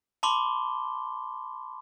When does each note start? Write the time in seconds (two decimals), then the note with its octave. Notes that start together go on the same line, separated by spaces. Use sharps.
0.23 A5 B5 C6 D6 G7